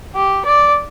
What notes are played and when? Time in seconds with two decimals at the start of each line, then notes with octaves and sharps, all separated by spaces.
0.15 G4
0.45 D5